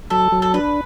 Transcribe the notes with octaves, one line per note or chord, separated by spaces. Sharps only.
F#3 A4
F#3
A4
D4 B4